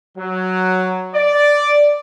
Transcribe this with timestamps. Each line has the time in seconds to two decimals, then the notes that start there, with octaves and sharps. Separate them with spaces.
0.16 F#3
1.14 D5